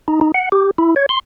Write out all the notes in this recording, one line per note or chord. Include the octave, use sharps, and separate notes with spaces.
D#4
D#4
F#5
G4
E4
C#5
C6